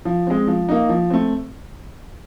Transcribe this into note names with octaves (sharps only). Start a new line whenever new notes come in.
F3
G#3 C4
F3
A#3 D#4
F3
A3 C4